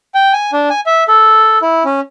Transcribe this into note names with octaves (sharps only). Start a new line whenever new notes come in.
G5
G#5
D4
G#5
E5
A4
E4
C#4